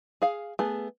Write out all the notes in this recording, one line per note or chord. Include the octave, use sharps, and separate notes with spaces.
G#4 F5
A3 B3 G#4